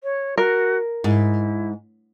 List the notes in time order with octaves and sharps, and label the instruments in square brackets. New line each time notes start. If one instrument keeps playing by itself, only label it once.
[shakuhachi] C#5
[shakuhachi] F#4 [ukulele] A#4
[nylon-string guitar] G#2 [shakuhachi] E4